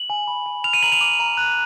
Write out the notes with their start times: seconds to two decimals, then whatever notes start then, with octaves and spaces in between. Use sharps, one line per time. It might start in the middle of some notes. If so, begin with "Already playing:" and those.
Already playing: F#7
0.10 G#5
0.27 B5
0.46 G#5
0.64 F6 F7
0.73 D#7
0.83 A#5 F#7
0.92 F7
1.01 D6
1.20 A#5
1.37 F#6